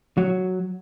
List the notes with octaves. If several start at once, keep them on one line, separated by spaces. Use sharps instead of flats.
F#3